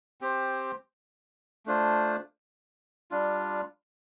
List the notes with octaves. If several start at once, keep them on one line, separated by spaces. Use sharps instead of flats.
C4 G4 C5
A3 D4 F4 C5
G3 D4 F4